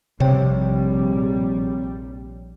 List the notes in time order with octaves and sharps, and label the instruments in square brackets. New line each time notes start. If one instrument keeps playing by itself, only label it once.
[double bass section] A#1 G3 [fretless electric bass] C3 [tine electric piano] C4 C#5 G5